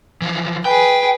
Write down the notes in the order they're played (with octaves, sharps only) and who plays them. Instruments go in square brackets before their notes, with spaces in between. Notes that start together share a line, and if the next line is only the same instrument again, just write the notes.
[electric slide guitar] E3 F3
[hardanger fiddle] G#4 B4 [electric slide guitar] G5